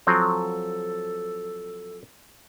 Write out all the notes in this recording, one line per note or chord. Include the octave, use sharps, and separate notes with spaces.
F3 F#3 C4 A4